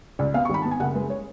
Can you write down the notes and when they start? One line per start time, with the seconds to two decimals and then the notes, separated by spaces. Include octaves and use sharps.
0.19 C#2 D5
0.34 B3 F5
0.45 C#6
0.49 G#1 B5
0.62 B3 A5
0.71 G#5
0.80 F#1 F#5
0.95 G#3 B4
1.10 C#5